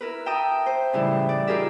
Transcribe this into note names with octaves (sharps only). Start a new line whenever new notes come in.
E4 A#4 B4
E5 G5 A5 A#5 D#6
C5
A2 C#3 E3 G3 E4
D5
D#4 F4 G4 G#4 A#4 E5